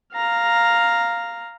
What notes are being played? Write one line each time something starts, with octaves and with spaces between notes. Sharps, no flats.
F5 A#5